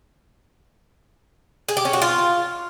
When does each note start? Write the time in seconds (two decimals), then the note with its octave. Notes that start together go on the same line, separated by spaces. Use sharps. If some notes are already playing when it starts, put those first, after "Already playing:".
1.69 G#4
1.77 G4
1.85 C#4
1.93 F#4
2.02 F4